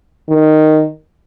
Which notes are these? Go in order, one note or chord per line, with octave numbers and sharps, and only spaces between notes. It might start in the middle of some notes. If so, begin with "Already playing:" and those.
D#3